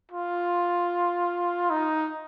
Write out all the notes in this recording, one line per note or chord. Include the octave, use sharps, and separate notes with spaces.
F4
D#4